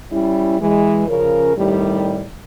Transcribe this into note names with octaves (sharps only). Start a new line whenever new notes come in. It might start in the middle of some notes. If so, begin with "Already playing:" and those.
G3 C#4 E4
E3 G#3
C#3 F3 C#4 A#4
A2 C3 D#3 G3